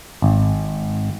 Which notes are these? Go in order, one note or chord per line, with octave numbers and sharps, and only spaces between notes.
G#1